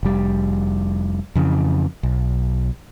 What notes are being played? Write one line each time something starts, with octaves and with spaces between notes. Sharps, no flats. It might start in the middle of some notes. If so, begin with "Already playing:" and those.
F1 G3
F2 C#3 E3
B1